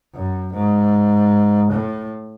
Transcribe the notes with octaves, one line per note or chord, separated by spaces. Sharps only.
F#2
G#2
A2